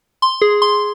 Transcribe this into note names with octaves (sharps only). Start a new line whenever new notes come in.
C6
G#4
C6